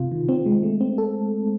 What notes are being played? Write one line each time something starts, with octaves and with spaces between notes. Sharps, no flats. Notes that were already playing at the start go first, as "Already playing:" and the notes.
Already playing: C3 F4
D#3
C4
G#3
A3
C4
A4